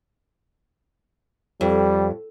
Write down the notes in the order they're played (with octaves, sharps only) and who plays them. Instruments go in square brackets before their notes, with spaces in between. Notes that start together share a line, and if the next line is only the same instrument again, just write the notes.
[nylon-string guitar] F2 [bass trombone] G3